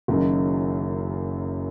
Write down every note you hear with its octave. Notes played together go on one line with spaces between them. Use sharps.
F#1 F#2 D#3